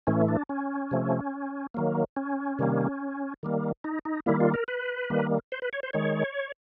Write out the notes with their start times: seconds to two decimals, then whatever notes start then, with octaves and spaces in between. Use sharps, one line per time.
0.07 A2 E3 A3 C#4
0.28 D4
0.49 C#4
0.91 C3 F3 A3
1.74 D#3 F#3 A#3
2.17 C#4
2.59 C3 D#3 G3 A#3
3.43 D#3 G3 A#3
3.84 D#4
4.05 D#4
4.26 D#3 G3 A#3 E4
4.40 F4
4.54 A#4
4.68 B4
5.10 D#3 G3 A#3
5.52 C5
5.62 B4
5.73 C#5
5.83 C5
5.93 D#3 G#3 C#5